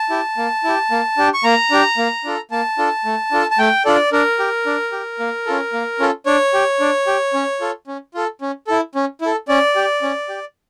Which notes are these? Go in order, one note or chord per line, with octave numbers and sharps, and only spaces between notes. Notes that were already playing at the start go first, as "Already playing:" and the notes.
Already playing: A5
E4 G4
A#3
E4 G4
A#3
D4 G4
C#6
A#3 A#5
D4 G4
A#3
D4 F4 A4
A#3 A5
D4 F4 A4
A3
D4 F4 A4
A5
A3 G5
D4 F4 A4 D5
D4 A#4
G4
D4
G4
A#3
C#4 F4 A4
A#3
C#4 F4 A4
D4 C#5
G4
D4
G4
C#4
F4 A4
C#4
F4 A4
C#4
E4 A4
C#4
E4 A4
C#4 D5
G4
C#4
G4